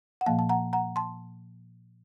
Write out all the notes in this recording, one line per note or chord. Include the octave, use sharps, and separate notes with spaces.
F#5
A#2 F3 A#3 F5 A5
A5
F#5 A#5
F#5 A#5
A5 C6